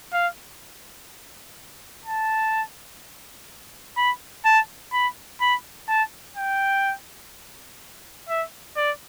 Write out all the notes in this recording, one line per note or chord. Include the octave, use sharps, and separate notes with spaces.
F5
A5
B5
A5
B5
B5
A5
G5
E5
D5